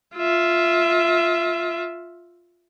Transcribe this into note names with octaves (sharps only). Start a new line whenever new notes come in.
F4 E5